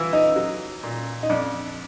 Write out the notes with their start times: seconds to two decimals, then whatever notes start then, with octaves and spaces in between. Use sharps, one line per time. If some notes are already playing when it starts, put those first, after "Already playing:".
Already playing: E3 E4 F4
0.13 D#4
0.36 F#3
0.83 A#2
1.23 D#4
1.29 F2 D4